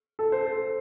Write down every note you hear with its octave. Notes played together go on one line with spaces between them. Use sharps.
A4
C5
A4